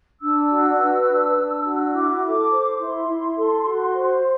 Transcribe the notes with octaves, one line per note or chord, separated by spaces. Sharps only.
D4 E6
F#4
B4
D4
D4
F#4
E4 D6
A4
C5
E4 C6
E4
A4
F#4
C5